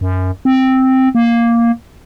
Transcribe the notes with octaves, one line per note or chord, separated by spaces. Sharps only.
F#2
C4
A#3